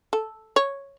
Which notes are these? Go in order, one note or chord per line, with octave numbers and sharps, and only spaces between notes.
A4
C#5